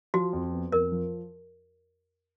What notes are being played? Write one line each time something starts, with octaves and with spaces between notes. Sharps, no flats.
F3 F#4
F2
B3
F2 A#4
F3